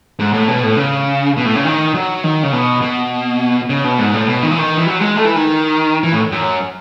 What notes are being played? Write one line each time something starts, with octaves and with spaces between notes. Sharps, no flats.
G#2
A2
B2
A2
C#3
B2
A2
C#3
D#3
F#3
D#3
C#3
B2
B2
C#3
B2
G#2
A2
B2
D#3
E3
D#3
E3
F#3
G#3
A3
E3
D#3
E3
A2
F#2